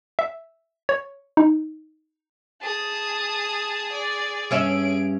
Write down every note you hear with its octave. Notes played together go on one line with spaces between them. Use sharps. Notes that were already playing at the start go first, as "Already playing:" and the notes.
E5
C#5
D#4
G#4 A5 D#6
D5
G2 C#4 E5 D7